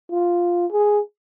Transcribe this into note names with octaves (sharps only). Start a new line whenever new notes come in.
F4
G#4